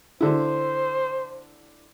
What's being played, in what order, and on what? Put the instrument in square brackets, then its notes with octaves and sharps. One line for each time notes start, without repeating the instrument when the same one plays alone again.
[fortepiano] D3 E4 [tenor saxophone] C5